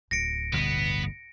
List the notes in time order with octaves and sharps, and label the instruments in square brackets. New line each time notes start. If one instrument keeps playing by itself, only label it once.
[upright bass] D1 [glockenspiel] A#6 C#7 D7
[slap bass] G1 D2 B2 [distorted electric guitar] B3